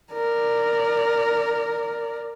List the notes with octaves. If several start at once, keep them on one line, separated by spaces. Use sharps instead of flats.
A#4 D5